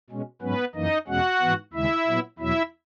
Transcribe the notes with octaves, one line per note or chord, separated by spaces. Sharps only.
B2 G#3 C#4
G#2 F#3 B3 C#4 B4
F#2 E3 A#3 D#4 D#5
E2 B2 G#3 C#4 F#4 F#5
G#2 E3 B3
D#2 C#3 G#3 E4 E5
A#2 F#3 B3
E2 B2 F#3 E4 E5